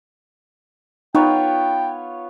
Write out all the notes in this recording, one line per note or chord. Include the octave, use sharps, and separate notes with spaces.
B3 D#4 F4 C#5 G5